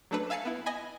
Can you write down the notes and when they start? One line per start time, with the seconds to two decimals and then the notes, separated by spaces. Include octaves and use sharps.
0.11 F#3 A3 D4 A4 B4
0.30 E5 F5 G#5 A5 C7 C#7
0.45 B3 E4
0.66 D#5 G#5 B5